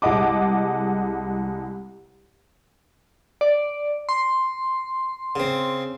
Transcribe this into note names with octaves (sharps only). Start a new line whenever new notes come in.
C2 G#3 D#5 F#5 D6
D5
C6
C#3 C4